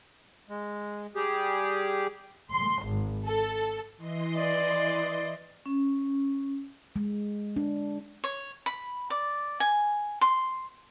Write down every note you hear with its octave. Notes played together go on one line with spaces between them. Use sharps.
G#3
G3 G4 G#4
C6
G#1
A4
E3 D#5 C6
D5
C#4
G#3
D4
C#5
B5
D5
G#5
C6